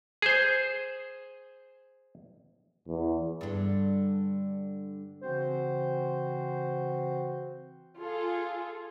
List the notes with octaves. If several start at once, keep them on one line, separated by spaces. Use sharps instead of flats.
G#4 C5
E2
G2 D3
C#3 E3 C4 F#4 C5
F4 G#4 A4